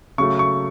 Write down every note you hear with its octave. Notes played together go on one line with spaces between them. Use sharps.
C#3 F#3 A3 C#6
C#6